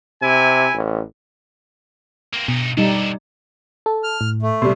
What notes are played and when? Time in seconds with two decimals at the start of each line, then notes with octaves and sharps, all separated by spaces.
0.22 C3 E4 G#5
0.75 A1
2.33 A#3 C4
2.48 G2 B2 D#4
2.77 C3 G3 D#4 A4
3.86 A4
4.04 F6
4.21 A2
4.42 A3
4.62 C3 G3 C6